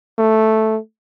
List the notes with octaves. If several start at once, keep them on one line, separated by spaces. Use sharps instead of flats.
A3